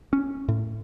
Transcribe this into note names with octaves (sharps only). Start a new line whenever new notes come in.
C#4
A2